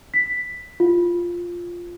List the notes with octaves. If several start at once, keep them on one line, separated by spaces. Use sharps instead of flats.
B6
F4